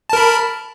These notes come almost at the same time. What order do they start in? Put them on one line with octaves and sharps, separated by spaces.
A5 A#4 B5